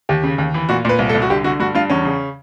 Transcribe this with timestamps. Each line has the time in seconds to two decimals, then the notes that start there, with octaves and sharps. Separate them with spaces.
0.09 D#2 G4
0.23 C#3
0.38 D#2
0.54 E3
0.69 A#2 F#4
0.85 A#2 B4
0.99 C2
1.09 A4
1.14 C2
1.22 F#4
1.30 D3 G4
1.44 D3 F#4
1.60 G2 F#4
1.75 G2 F4
1.90 E2 C#4
2.05 C#3